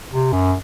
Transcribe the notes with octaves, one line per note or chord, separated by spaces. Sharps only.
C3
F#2